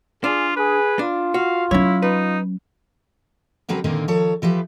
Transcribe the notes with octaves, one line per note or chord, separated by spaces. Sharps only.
D4 F4 G#4
G#4 B4
D4 F4
F#4 F5
F#3 C#4 E4 C#5
D#4 B4
D3 F#3 C4 A#4 B4
A#2 D3 D#3 A#3 C4 D#4
D#3 F3 A4 C#5
E3 F3 G4 B4